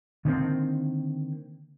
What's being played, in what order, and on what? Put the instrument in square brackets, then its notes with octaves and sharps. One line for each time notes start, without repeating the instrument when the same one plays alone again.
[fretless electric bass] D3 D#3 A#3 C4